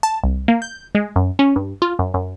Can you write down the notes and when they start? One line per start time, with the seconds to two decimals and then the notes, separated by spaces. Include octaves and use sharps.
0.03 A5
0.24 C2
0.48 A#3
0.62 G6
0.95 G#3
1.16 F#2
1.39 C#4
1.56 G2
1.82 F4
1.99 F#2
2.14 F#2